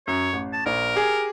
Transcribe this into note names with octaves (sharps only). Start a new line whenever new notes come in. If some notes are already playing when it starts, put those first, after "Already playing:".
F#2 C#5
A1
A5
A#1 A#4
G4 G#4 G#5